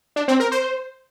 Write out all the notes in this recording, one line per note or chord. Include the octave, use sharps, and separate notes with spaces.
D4
C4
A#4
C5